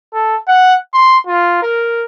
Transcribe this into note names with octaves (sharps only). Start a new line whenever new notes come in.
A4
F#5
C6
F4
A#4